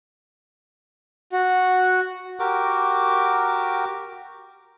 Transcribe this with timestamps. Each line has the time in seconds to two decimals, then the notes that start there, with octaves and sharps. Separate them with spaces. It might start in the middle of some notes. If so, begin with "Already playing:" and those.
1.32 F#4
2.40 F#4 G4 A#4 D6